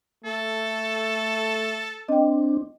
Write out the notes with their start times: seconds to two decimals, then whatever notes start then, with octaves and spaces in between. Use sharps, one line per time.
0.25 A3 A4
2.09 C4 D4 D#5 G5